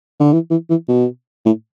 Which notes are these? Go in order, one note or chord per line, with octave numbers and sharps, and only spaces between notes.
D3
E3
E3
E3
B2
A2